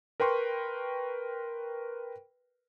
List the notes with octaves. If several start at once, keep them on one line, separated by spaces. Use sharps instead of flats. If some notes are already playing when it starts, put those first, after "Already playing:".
A#4 B4 G5 C6 C#6